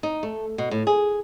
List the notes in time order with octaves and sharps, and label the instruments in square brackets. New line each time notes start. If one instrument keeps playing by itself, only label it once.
[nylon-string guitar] D#4
A3
B2
A2
G#4